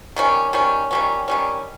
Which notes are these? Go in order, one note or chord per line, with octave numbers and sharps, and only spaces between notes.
D#3 G3 C#4
D#3 G3 C#4
D#3 G3 C#4
D#3 G3 C#4